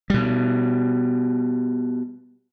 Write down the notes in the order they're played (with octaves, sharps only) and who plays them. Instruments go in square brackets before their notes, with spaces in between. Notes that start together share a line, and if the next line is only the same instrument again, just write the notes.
[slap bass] B2 G3